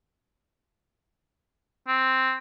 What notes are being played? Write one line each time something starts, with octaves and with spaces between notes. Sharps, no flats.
C4